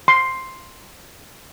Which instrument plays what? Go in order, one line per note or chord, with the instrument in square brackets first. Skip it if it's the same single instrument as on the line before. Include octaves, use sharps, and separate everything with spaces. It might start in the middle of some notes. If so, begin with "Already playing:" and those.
[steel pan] C6